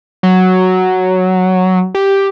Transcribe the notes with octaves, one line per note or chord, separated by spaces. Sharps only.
F#3
G4